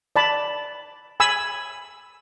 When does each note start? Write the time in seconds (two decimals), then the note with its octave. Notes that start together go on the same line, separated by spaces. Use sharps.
0.16 D5 A5 B5
1.20 G#5 B5 E6